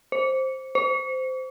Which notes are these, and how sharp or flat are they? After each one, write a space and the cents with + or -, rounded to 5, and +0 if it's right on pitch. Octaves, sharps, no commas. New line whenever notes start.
C5 +10
C5 -15